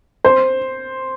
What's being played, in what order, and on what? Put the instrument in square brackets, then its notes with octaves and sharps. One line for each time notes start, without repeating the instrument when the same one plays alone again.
[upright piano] C5